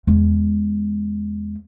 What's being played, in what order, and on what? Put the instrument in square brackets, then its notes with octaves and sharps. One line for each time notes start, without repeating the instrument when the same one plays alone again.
[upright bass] E2 G#3